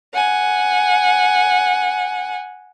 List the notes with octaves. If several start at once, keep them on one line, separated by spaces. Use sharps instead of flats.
F#5 G#5